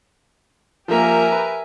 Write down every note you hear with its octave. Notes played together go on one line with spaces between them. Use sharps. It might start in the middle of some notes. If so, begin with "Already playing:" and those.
F3 A#3 G4 A#4 E5 G#5 A#5
B4